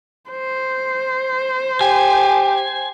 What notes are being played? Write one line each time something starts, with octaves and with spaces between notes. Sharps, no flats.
C5
G4 G#5